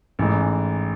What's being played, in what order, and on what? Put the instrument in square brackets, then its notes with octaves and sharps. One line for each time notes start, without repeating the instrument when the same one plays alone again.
[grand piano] A1 G#2 E3